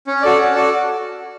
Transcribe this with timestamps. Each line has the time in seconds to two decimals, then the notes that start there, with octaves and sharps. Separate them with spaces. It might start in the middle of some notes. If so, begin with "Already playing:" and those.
0.07 C#4
0.22 F#4 A4 D5
0.38 C#4
0.54 F#4 A4 D5